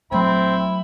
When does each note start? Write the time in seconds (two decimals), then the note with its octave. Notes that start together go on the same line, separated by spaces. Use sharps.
0.12 A#1 F#3 A3 C4 E4 B5